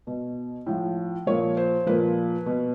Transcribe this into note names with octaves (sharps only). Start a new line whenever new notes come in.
B2
A2 F3
A#2 F3 C#5
C5
A#2 F3 B4
B2